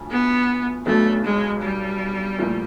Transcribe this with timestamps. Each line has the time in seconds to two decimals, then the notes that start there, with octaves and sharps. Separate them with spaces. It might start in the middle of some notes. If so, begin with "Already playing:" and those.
Already playing: D2 C#3 F3 A3
0.10 B3
0.86 B1 B2 F#3 A3 B3 D4
1.24 G#3
1.62 G3
2.38 C2 A#2 F3 A3 C4